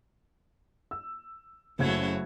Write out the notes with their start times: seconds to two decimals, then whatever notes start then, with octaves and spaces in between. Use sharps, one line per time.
0.91 E6
1.79 F#1 C#3 F#3 A3 E4 G#6